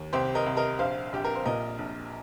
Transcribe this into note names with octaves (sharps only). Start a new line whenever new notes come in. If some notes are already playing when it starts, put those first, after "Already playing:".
Already playing: D#2
C2 G4 C5
A#4 D#5
C2
A#4 D#5
A#1 C5 F5
A#1 G4
A#4
C5
A#2 A#4 D#5
A#1